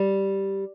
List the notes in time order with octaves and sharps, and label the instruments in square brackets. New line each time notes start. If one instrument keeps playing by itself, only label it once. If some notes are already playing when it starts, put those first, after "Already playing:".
Already playing: [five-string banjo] G3